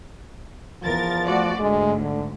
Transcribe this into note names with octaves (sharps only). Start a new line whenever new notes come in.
E2 F3 A#4 A6
A3 F#4 D5
D2 G#2 G#3
D3